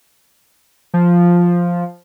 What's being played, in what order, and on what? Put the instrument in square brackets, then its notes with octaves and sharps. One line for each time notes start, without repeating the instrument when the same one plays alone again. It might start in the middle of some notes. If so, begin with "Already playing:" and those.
[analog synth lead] F3